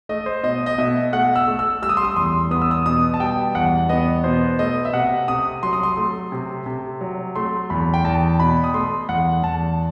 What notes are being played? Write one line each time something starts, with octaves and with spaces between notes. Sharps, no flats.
A3 D#5
C5
B2 D#5
D#5
B2 E5
A3 F#5
E6
A3
E6
G3 E6
D#6
C6
D#6
E2 C6
B3 D#6
E6
D#6
B2 D#6
A5
G3 G5
E2 F#5
B3 D#5
B2 C5
A3 D#5
E5
C3 F#5
C3 D#6
F#3 C6
D#6
C6
A3
C3
C3
F#3
A3 C6
E2 B5
G5
E2 A5
B2 B5
D#6
A3 C6
E2 F#5
E2 A5